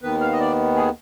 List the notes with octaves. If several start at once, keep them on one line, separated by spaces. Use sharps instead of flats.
D#2 D#3 B3 B4
F5
D#5
D5
G#4